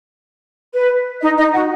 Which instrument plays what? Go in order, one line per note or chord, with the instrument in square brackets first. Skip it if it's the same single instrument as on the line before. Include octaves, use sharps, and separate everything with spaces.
[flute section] B4
D#4 D#5
D#4 D#5
F#4 F#5